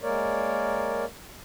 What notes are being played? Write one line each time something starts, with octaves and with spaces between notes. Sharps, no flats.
G#3 A#3 A#4 C#5 D5